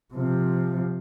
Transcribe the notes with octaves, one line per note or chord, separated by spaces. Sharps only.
C3 F3